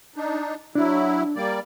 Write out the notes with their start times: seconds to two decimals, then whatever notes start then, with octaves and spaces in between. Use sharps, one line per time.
0.16 D4 D#4
0.75 F#3 D4 E4
1.36 G3 A#3 D5